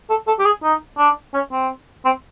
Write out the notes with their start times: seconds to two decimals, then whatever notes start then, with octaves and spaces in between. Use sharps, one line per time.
0.10 A4
0.27 A4
0.39 G4
0.46 G#4
0.63 D#4
0.98 D4
1.34 C#4
1.52 C4
2.05 C4